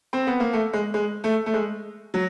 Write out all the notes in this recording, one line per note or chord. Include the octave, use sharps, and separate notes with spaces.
C4
B3
A#3
A3
G#3
G#3
A3
A3
G#3
F#3